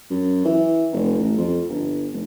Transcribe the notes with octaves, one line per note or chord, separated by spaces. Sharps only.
F#2
E3
F1
A1
F2
G1
F1